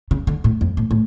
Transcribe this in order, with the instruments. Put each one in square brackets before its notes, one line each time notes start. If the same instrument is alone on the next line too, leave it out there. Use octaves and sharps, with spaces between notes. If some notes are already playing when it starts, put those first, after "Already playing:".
[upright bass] C#3
D3
A2
F2
A2
A2